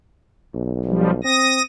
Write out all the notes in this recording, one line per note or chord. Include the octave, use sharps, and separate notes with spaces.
B1
F3 G3
C4 D#6 A#6